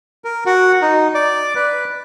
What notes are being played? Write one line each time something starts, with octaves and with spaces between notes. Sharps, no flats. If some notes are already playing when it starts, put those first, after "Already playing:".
A#4
F#4
D#4
D5
B4